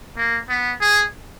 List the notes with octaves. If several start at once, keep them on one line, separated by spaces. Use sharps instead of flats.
A#3
B3
G#4